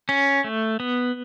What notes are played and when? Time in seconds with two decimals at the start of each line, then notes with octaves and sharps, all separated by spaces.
0.09 C#4
0.44 A3
0.80 B3